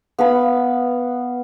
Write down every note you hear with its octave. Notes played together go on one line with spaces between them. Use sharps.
B3 F5 B5